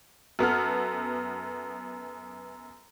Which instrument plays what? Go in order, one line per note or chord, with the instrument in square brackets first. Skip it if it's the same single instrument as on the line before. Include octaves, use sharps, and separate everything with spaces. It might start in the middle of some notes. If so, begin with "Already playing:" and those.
[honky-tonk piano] F#2 B3 A4 F6